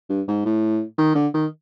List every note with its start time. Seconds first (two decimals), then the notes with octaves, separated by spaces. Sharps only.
0.10 G2
0.28 G#2
0.45 A2
0.98 D#3
1.15 D3
1.34 D#3